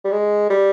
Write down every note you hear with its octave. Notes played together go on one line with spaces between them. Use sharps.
G3
G#3
G3